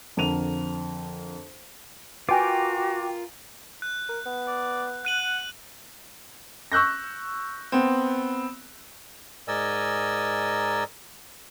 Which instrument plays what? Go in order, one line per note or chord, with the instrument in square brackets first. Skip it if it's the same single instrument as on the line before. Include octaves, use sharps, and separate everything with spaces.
[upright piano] F2 D3 A#4 D#7 F7
[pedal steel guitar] F4 A#4 [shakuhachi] F#4 [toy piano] B4 G#5 [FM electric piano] G5 D6
[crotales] F#6
[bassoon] A#4
B3
[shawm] D5
[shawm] F#5 [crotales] F#6 D#7 F#7
[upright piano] C#6 E6 F#6 G6 A#6
B3 C4
[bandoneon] G#2 A#4 D5 D#5 G#5 E6